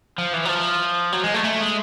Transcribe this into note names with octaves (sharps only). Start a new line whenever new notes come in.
F3
E3
F#3
F3
F#3
G#3
A3
A3
G#3